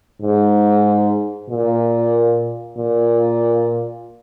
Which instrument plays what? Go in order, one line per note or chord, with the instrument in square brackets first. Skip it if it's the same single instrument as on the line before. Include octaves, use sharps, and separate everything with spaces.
[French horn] G#2
A#2
A#2